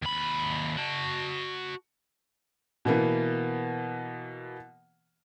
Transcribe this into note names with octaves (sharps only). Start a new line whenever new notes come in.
D#2 B5
F#4 A5
B2 E3 A#3 B3